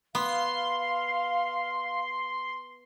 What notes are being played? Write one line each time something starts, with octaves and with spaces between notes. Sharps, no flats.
B3 F5 C6